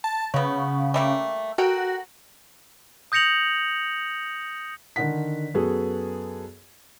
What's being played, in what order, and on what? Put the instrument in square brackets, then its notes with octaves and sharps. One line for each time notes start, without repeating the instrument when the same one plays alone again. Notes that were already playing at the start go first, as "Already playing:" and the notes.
[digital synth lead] A5
[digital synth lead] C#3 [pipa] F#3 B3
[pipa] G3 A3 A#3
[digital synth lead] F#4 [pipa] A4 A#4 G5
[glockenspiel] D#6 G6 A#6 C#7 F7 F#7
[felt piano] D3 D#3 F#5 B6
F#2 B3 F#4 G#4 A4